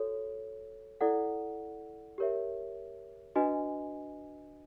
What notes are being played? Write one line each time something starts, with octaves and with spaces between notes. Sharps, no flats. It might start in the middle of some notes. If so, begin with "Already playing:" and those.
Already playing: F#4 A4 C#5
E4 A4 D5 F#5
G4 A#4 C#5 E5
D4 F#4 B4 D#5 G#5